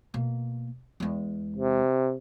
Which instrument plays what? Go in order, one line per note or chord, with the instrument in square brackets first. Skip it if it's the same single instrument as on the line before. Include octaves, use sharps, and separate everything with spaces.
[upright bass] B2 A#3
E2 G#3
[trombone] C3